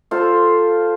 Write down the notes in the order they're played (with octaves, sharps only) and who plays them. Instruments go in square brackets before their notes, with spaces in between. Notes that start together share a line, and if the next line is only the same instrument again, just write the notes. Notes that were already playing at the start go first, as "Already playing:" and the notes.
[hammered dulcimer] F4 A4 C5 F5